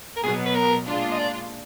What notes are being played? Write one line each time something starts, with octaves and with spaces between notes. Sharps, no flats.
A#4
B2 F#3 B3 G#4
B4
A#4
A#2 G#3 D4 F4
D#5
D5